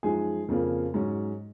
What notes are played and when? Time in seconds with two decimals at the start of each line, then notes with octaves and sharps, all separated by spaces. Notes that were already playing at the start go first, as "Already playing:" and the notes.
0.03 F#2 F3 G#3 D#4 G#4
0.48 F2 C#3 F3 A#3
0.94 G#2 F#3 C#4